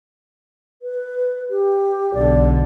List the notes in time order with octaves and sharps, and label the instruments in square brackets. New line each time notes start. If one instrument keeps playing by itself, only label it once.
[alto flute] B4
G4
[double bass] B1 D3 [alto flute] D5